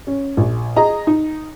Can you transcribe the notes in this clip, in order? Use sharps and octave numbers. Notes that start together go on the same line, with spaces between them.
C#4
A#1
G#4 D#5 A#5
D#4